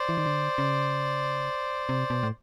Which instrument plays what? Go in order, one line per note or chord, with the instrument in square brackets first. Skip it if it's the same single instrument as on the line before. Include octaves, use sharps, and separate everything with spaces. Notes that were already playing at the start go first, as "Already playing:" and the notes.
Already playing: [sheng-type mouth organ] C5 D5
[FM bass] E3
D#3
D3
C#3
C3
B2
A2